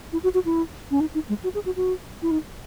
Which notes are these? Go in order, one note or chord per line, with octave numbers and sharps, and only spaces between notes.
E4
F#4
F#4
E4
C#4
D#4
D#4
G#3
F#4
G#4
F#4
F#4
E4
D#4